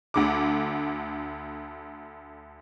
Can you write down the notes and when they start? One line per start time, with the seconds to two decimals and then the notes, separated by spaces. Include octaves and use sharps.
0.14 D2 D3 D6